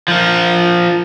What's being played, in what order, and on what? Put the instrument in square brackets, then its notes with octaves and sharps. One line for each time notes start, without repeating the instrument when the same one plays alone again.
[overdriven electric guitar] F3 A#4